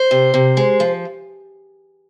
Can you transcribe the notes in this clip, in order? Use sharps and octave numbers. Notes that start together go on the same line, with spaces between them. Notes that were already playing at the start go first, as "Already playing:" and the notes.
Already playing: C5
C3
C3
G#3
F3